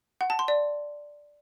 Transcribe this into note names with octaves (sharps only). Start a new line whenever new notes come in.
F#5
A5
C6
D5